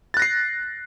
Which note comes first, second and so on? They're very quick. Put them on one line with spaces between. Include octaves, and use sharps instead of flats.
A6 F#6 A#6 C7